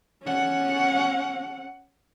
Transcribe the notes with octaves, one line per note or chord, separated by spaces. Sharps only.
C#4 F#5